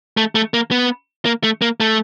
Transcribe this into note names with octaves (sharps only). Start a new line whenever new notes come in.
A3
A3
A#3
B3
A#3
A3
A#3
A3